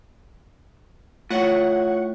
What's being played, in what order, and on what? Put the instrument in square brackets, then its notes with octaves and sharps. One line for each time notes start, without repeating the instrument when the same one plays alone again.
[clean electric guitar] A2 [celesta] F4 C#5 [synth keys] F#5 C#6